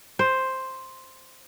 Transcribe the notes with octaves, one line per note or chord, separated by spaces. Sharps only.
C5